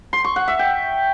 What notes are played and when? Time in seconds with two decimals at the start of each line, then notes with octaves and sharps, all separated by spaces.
0.13 C6
0.24 C#6
0.36 F#5
0.48 E5
0.59 G5